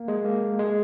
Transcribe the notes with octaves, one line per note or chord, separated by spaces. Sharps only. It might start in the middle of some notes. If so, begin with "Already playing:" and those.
Already playing: A#3
G#3
A#3
G#3